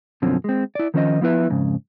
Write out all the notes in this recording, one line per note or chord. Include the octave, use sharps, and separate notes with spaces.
F#2 B2 D3 F3 C4 C#4
G#3 C4
E4 D5
D#3 F3 C#4 C5 C#5 D#5
F3 B3 E4 B4 E5
F2 G#2 C#3